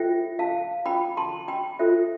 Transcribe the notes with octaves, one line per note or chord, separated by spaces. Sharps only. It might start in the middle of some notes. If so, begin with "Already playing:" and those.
Already playing: F4 A4 C5 E5 G5
F5 A5
F4 C5 G5 B5
A5 C6
G5 B5
F4 A4 C5 E5